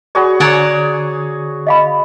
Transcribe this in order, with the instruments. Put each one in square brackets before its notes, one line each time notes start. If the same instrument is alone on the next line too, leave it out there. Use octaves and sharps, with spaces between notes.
[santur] F#4 G#4 C#5 [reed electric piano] D5 B5
[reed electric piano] D3 A#5 [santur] G#4 [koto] C#5 D5 F#5
[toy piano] D#5 F5 B5